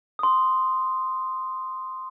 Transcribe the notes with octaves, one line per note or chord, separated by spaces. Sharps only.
C6 D#6